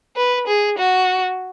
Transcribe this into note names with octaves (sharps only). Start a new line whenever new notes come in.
B4
G#4
F#4